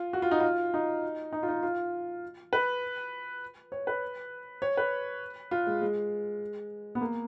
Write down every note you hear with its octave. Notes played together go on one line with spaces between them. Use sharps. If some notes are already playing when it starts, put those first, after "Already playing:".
Already playing: F4
F#4
F4
D#4
F4
D#4
D#4
F4
D#4
F4
B4
C#5
B4
C#5
B4
F4
G#3
G#3
B3
A#3